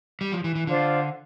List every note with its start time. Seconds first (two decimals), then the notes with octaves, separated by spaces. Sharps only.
0.21 G3
0.32 F3
0.44 E3
0.55 E3
0.67 D3 D4 F4 C5 F5